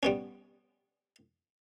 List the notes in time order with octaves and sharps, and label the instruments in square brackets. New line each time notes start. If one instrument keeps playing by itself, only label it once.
[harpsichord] G3 B3 C#4